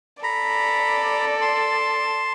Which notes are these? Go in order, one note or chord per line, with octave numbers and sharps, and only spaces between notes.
A4 D5 A#5 B5
A5 C6